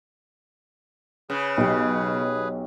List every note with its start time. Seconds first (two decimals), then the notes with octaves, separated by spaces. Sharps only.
1.30 C#3 G#4 B4
1.57 B1 G4